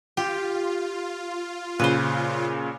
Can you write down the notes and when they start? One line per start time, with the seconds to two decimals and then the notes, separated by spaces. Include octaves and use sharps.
0.17 F4 G4
1.79 A#2 C#3 B4 C5